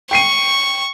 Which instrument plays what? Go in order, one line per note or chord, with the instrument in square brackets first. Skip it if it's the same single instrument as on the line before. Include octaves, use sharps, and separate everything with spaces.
[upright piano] G5 C7 D#7 [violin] C#6